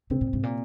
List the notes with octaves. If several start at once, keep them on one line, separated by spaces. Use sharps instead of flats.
C3 C4
A#2
G#2 C3
A#2